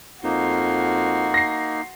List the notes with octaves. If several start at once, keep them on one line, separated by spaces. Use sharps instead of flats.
F2 A#3 D#4 F#4 C6
A#6 C7